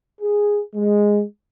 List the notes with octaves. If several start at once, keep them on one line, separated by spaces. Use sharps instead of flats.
G#4
G#3